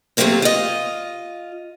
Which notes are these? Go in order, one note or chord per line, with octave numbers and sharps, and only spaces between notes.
E2 C3 F#3 A3 A#3 C4
F4 D#5